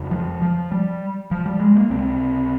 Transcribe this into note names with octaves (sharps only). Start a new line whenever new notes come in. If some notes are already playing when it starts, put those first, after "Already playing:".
Already playing: F2 C#3
F3
F3
G3
F3
G3
G#3
A#3
C#2 C3 C4